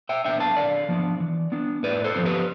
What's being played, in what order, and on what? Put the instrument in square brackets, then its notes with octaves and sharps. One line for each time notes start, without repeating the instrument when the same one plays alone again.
[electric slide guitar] E5 G5
B3 D4 E5 G5
F5 A5
D3 D5 F5
F3 B3 D4
E3
B3 D4
A2 B4 D5
A4 C5
F3 B3
G4 B4